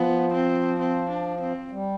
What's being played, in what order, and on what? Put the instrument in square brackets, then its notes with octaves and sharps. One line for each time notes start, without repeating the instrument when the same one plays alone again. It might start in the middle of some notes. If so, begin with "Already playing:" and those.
Already playing: [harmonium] F3 [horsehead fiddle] B3
[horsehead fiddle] C4
C4
D4
C4
[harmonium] G3